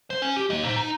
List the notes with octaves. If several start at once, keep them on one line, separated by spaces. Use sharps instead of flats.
C5
C#4
G4
A#3 D#5
D#4 C5
D#4